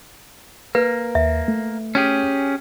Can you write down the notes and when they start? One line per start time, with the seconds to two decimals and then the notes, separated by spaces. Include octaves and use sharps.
0.75 A#3 B4
1.15 D#2 E5
1.48 A3
1.95 C#4 G4 G#4